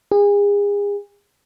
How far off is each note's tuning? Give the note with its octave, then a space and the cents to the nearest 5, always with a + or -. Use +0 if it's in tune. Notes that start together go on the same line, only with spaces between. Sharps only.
G#4 -35